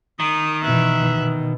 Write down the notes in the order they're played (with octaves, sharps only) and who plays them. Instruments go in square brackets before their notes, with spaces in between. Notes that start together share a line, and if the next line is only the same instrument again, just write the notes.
[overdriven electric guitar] D#3 [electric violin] D#6
[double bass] B2 E3 [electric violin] E5 F#6
[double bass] B2